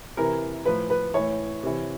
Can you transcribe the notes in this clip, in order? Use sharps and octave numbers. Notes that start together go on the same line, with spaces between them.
C3 E3 A#4
A2 F3 B4
B4
A2 E3 C#5
C3 E3